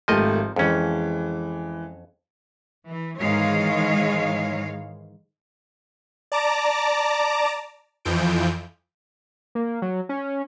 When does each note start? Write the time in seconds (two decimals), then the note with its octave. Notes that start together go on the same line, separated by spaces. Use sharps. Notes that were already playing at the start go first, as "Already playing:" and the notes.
0.08 G#1 F3 A3 G4 D#5
0.56 F2 E3 G#3 C#4
2.90 E3
3.20 G#2 D#3 E3 G#3 C#5 F5
6.32 D5 A5 A#5 D6
8.05 F2 E3 F3 G6 D7
9.55 A#3
9.82 F#3
10.09 C#4